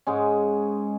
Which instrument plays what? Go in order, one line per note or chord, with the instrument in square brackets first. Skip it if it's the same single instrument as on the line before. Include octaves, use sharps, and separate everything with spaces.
[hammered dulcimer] G#2 G#3 C#4